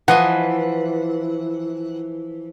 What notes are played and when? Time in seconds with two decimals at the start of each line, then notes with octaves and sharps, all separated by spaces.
0.08 E3 F3 D#5 F#5 G#5